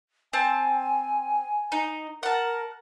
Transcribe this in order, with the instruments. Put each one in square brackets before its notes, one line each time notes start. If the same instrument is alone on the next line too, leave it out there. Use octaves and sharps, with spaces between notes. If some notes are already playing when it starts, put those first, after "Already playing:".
[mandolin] C4 A5 [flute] G#5
[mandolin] D#4
[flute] A#4 [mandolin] F#5 A5